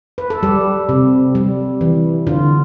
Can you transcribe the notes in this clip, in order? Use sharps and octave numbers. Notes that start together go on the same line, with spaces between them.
B4
A4
G3 G4
C3
G3
E3
D3 F4